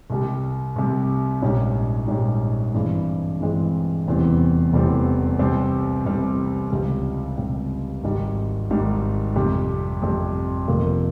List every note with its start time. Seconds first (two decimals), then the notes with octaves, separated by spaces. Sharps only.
0.10 C2 C3 G3
0.76 C2 C3 G3
1.42 A#1 G#2 G3 C#4
2.08 A#1 G#2 G3 C#4
2.74 G2 E3 G#3 C4
3.41 G2 E3 G#3 C4
4.07 F1 E2 E3 G3 C4
4.73 F1 E2 E3 G3 C4
5.39 C2 C3 G3 C4
6.05 C2 C3 G3 C4
6.70 C#2 C3 G3
7.37 C#2 C3 G3
8.03 G#1 G#2 G3
8.70 G#1 G#2 G3
9.36 F2 C3 G3
10.02 F2 C3 G3
10.68 F1 F2 C3 F3 A#3